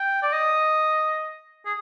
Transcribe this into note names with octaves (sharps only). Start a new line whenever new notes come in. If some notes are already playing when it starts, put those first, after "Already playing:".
Already playing: G5
D5
D#5
G#4